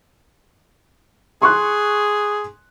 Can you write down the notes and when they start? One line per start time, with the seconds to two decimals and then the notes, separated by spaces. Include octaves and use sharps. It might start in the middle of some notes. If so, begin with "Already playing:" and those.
1.42 G#4 C6 C#6 F#6